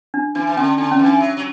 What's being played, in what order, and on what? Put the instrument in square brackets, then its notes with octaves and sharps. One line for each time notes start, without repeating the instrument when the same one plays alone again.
[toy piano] D4
[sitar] E3 [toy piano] D4
[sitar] E3
[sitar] D3 [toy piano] C#4
[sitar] D3 [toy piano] D4
[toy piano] C#4
[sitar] E3
[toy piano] D4
[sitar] F#3
F#3